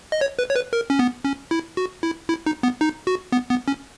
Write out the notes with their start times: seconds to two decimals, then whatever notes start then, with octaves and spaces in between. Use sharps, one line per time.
0.12 D#5
0.21 C#5
0.39 B4
0.50 C#5
0.56 B4
0.73 A#4
0.90 C#4
0.99 B3
1.25 C#4
1.51 E4
1.77 F#4
2.03 E4
2.29 E4
2.46 D#4
2.63 B3
2.81 D#4
3.07 F#4
3.32 B3
3.50 B3
3.68 C#4